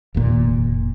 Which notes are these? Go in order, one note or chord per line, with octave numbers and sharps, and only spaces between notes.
F1 D#2 A#2